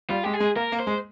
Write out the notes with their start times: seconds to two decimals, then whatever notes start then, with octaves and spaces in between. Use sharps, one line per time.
0.10 G3 F4
0.24 G#3 G4
0.34 G#4
0.40 G#3
0.56 A#3 A#4
0.72 A#3
0.80 C5
0.87 G#3